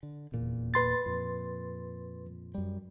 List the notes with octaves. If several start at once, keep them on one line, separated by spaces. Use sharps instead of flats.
D3
D#1 E2 A#2
B4 C6 A6
F2 A#2
F#2 G3